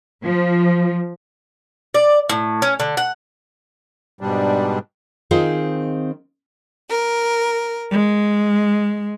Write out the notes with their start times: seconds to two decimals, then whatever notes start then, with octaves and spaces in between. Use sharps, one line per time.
0.24 F3
1.94 D5
2.29 A2
2.62 C#4
2.80 D3
2.97 F#5
4.21 G#2 B2 G3 D4
5.31 D#3 C4 D#4 F4 G#4 C5
6.89 A#4
7.91 G#3